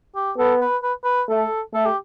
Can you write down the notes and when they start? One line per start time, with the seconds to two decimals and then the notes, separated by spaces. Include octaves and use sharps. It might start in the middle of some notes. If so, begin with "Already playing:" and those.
0.16 G4
0.38 B3 A4
0.61 B4
0.83 B4
1.04 B4
1.29 A3 A4
1.74 A3 A4
1.86 G4